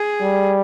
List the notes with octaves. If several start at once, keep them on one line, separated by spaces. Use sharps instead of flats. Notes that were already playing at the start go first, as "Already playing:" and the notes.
Already playing: G#4
G3